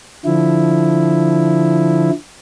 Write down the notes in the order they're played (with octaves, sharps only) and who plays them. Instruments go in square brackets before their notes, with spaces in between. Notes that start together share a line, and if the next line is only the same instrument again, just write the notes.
[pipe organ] D3 F3 E4